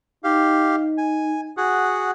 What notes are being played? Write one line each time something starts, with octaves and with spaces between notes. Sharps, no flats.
D#4 G4 F5
G#5
F#4 G#4 F#5